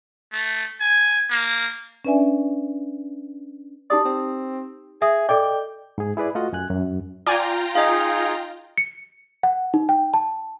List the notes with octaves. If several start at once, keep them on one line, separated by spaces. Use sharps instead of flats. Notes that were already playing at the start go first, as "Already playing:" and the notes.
A3
G#5
A#3
C#4 D4 B4 D5 E5 G#5
D#4 G4 D5 D#6
C4
G#4 E5 D#6
A4 D5 D#5 G5 D6
G#2 G#4
E4 G#4 B4 D5
A3 F4 F#4 D#5 F#5
F#2 G#5 F#6
F#2
F4 D5 G5 G#5 A#5
D#4 G#4 D#5 F5
C#7
F#5
D#4
G5
A5